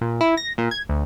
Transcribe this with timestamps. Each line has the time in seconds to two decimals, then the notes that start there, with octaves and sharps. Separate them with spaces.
0.01 A#2
0.21 E4
0.37 A#6
0.58 A#2
0.71 G#6
0.89 D2